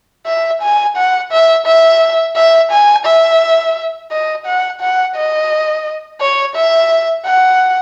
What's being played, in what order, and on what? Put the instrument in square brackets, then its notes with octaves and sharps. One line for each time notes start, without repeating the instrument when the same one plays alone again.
[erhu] E5
G#5
F#5
E5
E5
E5
G#5
E5
D#5
F#5
F#5
D#5
C#5
E5
F#5